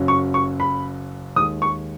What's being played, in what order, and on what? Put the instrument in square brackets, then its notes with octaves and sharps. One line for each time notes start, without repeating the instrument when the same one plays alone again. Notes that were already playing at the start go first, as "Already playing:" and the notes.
Already playing: [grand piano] F#1 F#2 F#3 C#4
[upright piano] C#6
C#6
B5
[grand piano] D#2 D#3 G#3 [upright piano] D#6
[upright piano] C#6